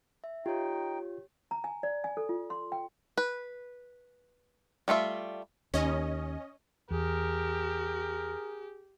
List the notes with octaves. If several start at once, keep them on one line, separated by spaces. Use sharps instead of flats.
E5
D#4 F4 G4 C#5 G5
A#5
G#5
D5
G#5
A4
F4
C6
G5
B4
G3 A3 F4 E5
D#2 C#4 D#5
E2 G4 G#4 A#4